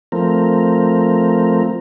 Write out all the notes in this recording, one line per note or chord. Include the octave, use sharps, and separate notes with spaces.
F3 A3 C4 A#4